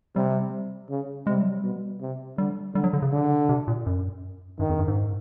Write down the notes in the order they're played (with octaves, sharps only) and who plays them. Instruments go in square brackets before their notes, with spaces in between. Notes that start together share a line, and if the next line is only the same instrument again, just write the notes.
[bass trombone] C3 [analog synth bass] G3
[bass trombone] C#3
[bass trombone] C3 [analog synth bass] G#3
[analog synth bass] G3
F#3
G3
[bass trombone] B2
C3
[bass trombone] D3 [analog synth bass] G3
[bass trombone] D3 [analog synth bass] G3
[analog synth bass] F#3
D3
C#3
[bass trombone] D3
[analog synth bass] C3
A#2
F#2
[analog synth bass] G2 [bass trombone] D#3
[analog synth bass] F2
G2
G#2